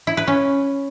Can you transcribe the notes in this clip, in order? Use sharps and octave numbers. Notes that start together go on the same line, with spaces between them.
E4
B4
C#4